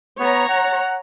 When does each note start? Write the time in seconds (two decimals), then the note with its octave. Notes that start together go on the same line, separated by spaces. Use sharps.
0.19 B3 C#5 A#5
0.49 F#5